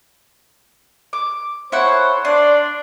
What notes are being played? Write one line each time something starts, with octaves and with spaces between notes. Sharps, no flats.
D6
E4 A4 C5 C#5 F#5
D4 D5 C6